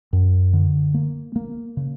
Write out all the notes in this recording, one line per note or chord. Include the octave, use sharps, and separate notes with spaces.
F#2
D3
A#3
A#3
C#3